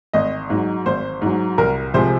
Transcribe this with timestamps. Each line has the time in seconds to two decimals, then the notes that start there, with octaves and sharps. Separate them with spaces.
0.13 G#1 D#5
0.50 G#2 F#3
0.86 G#1 C5
1.22 G#2 F#3
1.58 C2 A#4
1.94 C3 F3 G#3 C5